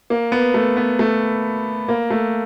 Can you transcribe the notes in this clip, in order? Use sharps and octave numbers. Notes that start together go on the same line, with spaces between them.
A#3
B3
A3
B3
A3
A#3
A3